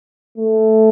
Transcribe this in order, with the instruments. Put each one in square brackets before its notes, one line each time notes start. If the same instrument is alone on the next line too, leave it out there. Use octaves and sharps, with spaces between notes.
[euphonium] A3